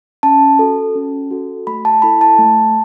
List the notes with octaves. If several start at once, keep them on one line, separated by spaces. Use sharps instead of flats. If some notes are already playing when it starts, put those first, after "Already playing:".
C#4 A5
F#4 A4
C#4
F#4 A4
A3 B5
A5
E4 A4 B5
A5
A3